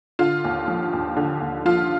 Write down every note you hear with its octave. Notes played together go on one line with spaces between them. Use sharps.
D3 F4
D#2
F3
D#2
D3
D#2
F3 F4